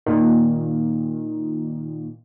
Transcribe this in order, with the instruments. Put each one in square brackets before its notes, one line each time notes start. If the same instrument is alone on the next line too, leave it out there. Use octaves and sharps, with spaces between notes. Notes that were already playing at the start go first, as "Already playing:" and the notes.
[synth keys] A#2 D#3